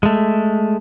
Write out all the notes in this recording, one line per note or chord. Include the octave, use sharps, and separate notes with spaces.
G#3 A3